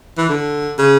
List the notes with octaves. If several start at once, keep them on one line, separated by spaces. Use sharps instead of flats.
E3
D3
C#3